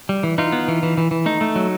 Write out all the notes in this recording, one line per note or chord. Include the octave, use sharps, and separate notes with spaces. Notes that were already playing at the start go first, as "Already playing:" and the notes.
G3
E3
E3 D#4 F4
B3
E3
E3
E3
E3
A3 D#4
A3
F#3